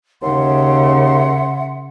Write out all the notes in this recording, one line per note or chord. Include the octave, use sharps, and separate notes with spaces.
D#2 C#3 E5 F#5 C6